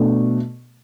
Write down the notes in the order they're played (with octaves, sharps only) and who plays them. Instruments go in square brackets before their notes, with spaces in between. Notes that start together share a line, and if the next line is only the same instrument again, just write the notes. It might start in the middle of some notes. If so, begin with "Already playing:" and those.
Already playing: [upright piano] B2 A3 D4